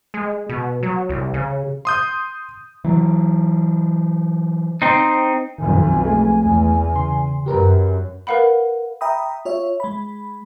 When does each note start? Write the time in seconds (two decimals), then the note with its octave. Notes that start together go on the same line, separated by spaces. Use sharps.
0.14 G#3
0.49 B2
0.83 F#3
1.09 C2
1.34 C#3
1.85 C6 D#6 G6
2.84 E3 F#3
4.82 C4 D#4
5.58 B1 F2 D#3 G#5
6.04 G#3 A3
6.43 E2
6.94 C#3 C6
7.46 F#2 F#3 G4 A#4 B4
8.27 A#4 B4 F5 F#5 B5
9.01 E5 G5 A#5 B5 D#6
9.45 F4 C#5 E5
9.80 G#3 B5